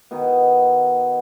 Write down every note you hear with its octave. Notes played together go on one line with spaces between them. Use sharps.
B2 D#3 B3